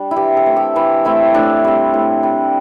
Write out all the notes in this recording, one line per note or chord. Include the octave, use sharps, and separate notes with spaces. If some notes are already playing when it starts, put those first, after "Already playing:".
Already playing: G3 D4
E4
E3 G4
A4
A3 C4
G4
E3 E4
A3 C4 E4
A2 D4
G3 C4
A2
G3 C4